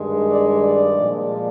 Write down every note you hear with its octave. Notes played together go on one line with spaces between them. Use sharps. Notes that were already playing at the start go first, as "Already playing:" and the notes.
Already playing: G2 D#3 G#3
D5
D5
A#2 F3 G#3